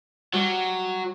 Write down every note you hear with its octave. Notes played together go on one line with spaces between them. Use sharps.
F#3 G3